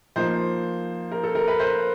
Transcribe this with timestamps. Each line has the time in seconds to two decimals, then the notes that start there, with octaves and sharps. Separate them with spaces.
0.16 F3 A#3 D#4 C5
1.12 A#4
1.23 A4
1.35 A#4
1.48 B4
1.59 C5